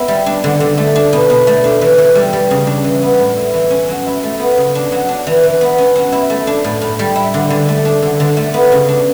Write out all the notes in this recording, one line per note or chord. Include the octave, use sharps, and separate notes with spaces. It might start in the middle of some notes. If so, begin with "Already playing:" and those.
Already playing: B3 E4
G3
D4
D3
D3
A3
D4
B2
B2
A3
D4
E3
E3
G3
G3
C#3
D4
E3
B3
A2
E4
E3
C#4
F#3
E4
A3
B3
C#3
D4
F#3
D4
E3
E3
B3
C#4
F#3
E4
A3
D4
A2
A2
G3
E4
D3
D3
A3
D4
D3
D3
A3
B3
C#3
D4